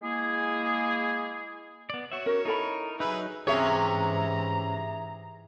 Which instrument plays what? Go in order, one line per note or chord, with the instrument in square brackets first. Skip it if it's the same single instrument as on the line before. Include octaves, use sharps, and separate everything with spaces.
[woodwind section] G#3 A#3 E4 G#4
[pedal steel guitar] B3 D5
[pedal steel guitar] F#4 E5 [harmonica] C#5
[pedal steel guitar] C#4 [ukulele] F#4 A#4
[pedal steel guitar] D#4 A#4 [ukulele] E4 A4 B5
[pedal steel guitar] F#3 D#4 [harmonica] G#4 B4 E5
[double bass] G#2 E3 [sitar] C3 C#4 C#5 [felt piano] G#4 E5 [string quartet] A#5